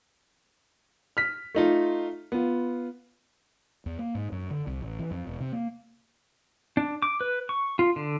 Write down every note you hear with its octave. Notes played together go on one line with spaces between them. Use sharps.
F6 B6
A3 D#4 F4
B3 F4
E2
A#3
G#2
F#2
D3
C2
A1
E3
F2
E1
C3
A#3
D4
D6
B4
C#6
F4
D3